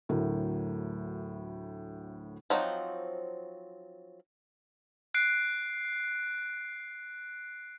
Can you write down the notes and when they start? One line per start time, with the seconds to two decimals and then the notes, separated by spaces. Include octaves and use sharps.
0.09 D2 A2 F#3 A#4
2.50 F3 F#3 C4 D#4
5.14 F#6 C7 D7